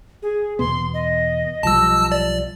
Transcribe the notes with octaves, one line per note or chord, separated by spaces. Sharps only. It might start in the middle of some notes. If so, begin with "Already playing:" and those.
G#4
E2 B2 B3 C6
D#5
B1 F3 G3 A5 E6
D5